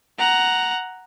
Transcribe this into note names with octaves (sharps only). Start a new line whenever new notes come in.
F#5 A#5